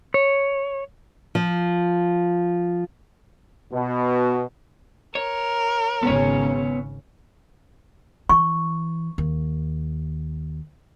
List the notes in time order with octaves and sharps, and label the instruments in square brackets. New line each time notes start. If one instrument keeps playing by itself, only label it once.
[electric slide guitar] C#5
[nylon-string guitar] F3
[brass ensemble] B2
[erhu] A#4 [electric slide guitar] C#5
[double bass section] G#1 C#3 C#4 [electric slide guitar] B3 C#5
[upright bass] E3 [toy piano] C#6
[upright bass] D#2